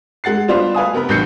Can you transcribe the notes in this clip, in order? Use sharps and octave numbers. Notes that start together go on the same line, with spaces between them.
G#3 F#5 A6 C7
G3 B3 D4 F4 C5 D5
B4 F5 G#5 D#6
C3 B3 A#4 B5
A1 G2 G6 C7 C#7